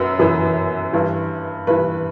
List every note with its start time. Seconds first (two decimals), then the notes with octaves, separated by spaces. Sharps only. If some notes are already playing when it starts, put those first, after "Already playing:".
Already playing: F#2 B4
0.19 F#2 E3 B4
0.93 G2 E3
1.67 G2 E3 B4